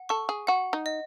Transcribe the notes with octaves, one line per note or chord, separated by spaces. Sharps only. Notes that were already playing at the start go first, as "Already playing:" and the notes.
Already playing: F#5
A4 C#6
G#4
F#4 F#5
D#4
D#5